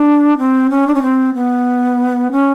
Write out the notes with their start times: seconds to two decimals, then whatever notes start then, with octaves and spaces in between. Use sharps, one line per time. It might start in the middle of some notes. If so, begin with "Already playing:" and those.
Already playing: D4
0.38 C4
0.70 C#4
0.87 D4
0.95 C#4
1.02 C4
1.34 B3
2.32 C#4